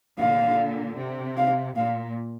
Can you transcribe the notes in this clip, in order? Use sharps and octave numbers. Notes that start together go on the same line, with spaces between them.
A#2 D3 F5
C3
F5
A#2 F5